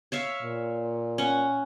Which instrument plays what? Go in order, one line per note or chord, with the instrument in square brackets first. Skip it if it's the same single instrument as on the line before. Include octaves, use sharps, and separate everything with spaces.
[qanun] C#5 E5 F5
[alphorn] A#2
[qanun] C#4 F#5